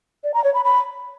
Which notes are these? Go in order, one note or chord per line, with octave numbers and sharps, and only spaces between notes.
D5
A#5
C#5
B5
B5